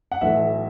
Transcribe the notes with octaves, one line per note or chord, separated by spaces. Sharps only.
F#5
B1 A2 E3 E5